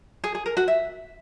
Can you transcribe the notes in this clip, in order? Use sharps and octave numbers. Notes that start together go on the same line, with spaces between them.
G#4
G#4
A#4
F#4
E5